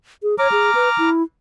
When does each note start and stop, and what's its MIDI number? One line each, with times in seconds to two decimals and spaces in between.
0.23 0.35 68
0.39 0.48 73
0.39 1.10 82
0.39 1.10 86
0.39 1.10 89
0.52 0.71 68
0.75 0.89 71
0.98 1.23 64